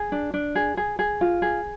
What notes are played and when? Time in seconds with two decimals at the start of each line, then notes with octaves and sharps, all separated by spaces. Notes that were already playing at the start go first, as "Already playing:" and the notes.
Already playing: G#4
0.12 D4
0.34 D4
0.55 G#4
0.77 G#4
0.99 G#4
1.21 F4
1.42 G#4